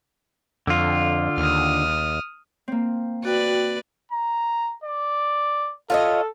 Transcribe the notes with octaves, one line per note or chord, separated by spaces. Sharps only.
F2 D3 F4
D#2 D#6 F6
A#3 C4
F#4 B4 D5 G5
A#5
D5
F4 A4 C#5 D#5